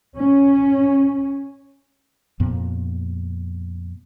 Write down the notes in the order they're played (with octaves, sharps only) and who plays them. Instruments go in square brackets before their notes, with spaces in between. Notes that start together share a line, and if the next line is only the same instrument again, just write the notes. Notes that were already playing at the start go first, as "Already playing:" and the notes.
[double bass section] C#4
[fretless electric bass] F2 A#2 B3